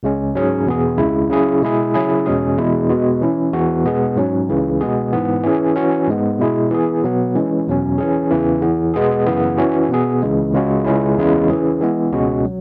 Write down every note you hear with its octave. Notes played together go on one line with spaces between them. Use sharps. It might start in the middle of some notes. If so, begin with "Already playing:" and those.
C#2 C#3 G#3 C#4
G#2 F#3 C#4 G#4
E2 B2 B3 G#4
C#2 C#3 G#3 E4
C#3 F#3 E4 G#4
B2 G#3 E4 G#4
C#3 F#3 C#4 E4 G#4
E2 B2 G#3 C#4 G#4
E2 B2 G#3 E4
B2 G#3 B3 F#4
E3 C#4 E4
E2 E3 B3 F#4
B2 G#3 B3 G#4
G#2 F#3 C#4
C#2 C#3 E3
B2 G#3 B3 G#4
G#2 E3 B3
E3 C#4 G#4
E3 C#4 F#4
G#2 G#3 B3
B2 G#3 E4 G#4
E3 B3 G#4
B2 F#3 B3
E3 G#3 C#4
E2 B2 F#3 C#4
E3 C#4 G#4
E2 C#3 E3
E2 E3 B3
B2 G#3 B3 G#4
F#2 C#3 E3 B3
E3 C#4 F#4
B2 B3 G#4
C#2 C#3 E3 G#3
C#2 C#3 G#3 C#4 F#4
C#2 C#3 G#3 C#4 E4
E2 C#3 E3 G#3 E4
E3 C#4 G#4
E3 G#3 B3
C#2 B2 G#3 C#4 F#4
F#3